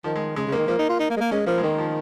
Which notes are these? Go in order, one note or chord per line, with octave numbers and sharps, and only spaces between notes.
D#3 F3
G#3
C#3 G#3
C#3
A#3
D#3
F3 A#3
D#4
F4
D#4
A#3
G#3
A#3
G#3 C#4
F3 A#3
G#3
D#3 A#3
F3